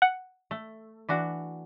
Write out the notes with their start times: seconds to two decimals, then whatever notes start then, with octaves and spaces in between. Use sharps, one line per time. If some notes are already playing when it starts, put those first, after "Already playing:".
0.02 F#5
0.51 A3
1.09 E3 D4 F#4